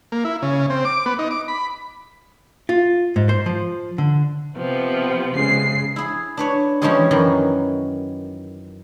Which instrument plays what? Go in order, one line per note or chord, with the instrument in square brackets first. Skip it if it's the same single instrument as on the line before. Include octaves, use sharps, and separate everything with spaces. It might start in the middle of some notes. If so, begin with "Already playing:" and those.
[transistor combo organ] A#3
E4
C#3
C4
D6
B3
D#4
D6
B5
[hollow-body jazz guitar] F4
G#2
C5
F3
D3
[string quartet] C3 F3 B3
[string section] C#3 G#3 C7
[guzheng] E4 G#4
D4 B4 C#5
E3 F3 G3 G#3 C#4 G#4
F#2 D#3 E3